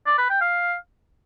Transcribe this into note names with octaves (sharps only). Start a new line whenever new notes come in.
D5
B4
G5
F5